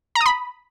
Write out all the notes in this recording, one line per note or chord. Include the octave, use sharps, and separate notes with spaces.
A#5
D#6
B5